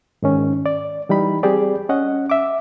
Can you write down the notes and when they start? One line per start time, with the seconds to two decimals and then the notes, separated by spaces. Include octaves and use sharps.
0.22 G#2 D#3 C#4
0.66 D5
1.09 E3 G3 D#4 B5
1.43 G3 C4 G4 G#4 D5
1.89 C#4 D#5 F#5
2.30 E5 D6